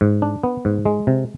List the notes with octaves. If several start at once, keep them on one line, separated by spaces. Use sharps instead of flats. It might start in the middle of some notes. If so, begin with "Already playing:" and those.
G#2
D4
B3
G#2
G#3
C3